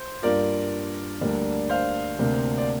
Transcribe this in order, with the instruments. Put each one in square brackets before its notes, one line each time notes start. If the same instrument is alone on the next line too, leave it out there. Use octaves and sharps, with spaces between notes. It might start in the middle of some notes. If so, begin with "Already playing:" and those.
Already playing: [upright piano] C5
[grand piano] G2 G3 A#3 F4 [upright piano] A#4 D5
[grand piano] D2 D3 G3 A#3 D4
[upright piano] C5 F5
[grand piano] D2 C3 A#3 D4
[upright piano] D5